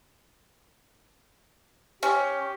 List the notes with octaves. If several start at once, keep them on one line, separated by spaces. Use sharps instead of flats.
C#4 G4